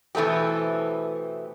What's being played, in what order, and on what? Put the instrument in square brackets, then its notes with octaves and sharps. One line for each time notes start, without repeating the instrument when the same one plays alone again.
[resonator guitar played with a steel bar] B2 E3 A3 C4 G4